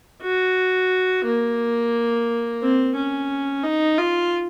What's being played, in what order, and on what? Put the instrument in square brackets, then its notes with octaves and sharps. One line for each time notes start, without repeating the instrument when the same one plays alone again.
[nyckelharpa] F#4
A#3
C4
C#4
D#4
F4